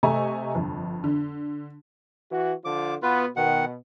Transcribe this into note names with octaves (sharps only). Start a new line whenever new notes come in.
C3 A3 D#5 G#5 A#5 C#6
G1 F2
D3
E3 F#4
D3 F3 D6
B2 B3 F4 B4
B2 D#3 F#5